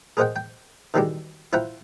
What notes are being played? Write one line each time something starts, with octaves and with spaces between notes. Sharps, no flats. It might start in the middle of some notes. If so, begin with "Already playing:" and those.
G#4 A#4 C5 D#5 F#5 G5
G5
D#3 E3 G3 G#3 F#4 G4
E4 F4 C5 F#5 G5 A#5